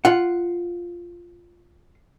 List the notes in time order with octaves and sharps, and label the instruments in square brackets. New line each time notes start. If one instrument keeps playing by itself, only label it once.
[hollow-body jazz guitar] F4 F#5